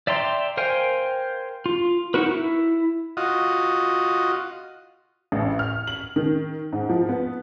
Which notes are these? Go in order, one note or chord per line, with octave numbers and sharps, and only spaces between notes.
D5 E5 G5 A#5 C6
A#4 C5 F5 G5 G#5
F4
D#4 E4 F#4 A#4 B4
E4
F4 F#4 D#5
A1
F6
F#7
D#3
G#2
F3
B3